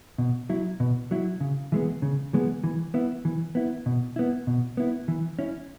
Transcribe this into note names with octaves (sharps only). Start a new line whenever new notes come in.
B2
F#3 E4
B2
F#3 E4
C#3
E3 G#3 B3
C#3
E3 G#3 B3
E3
B3 E4
E3
B3 E4
B2
B3 E4
B2
B3 E4
E3
C#4 E4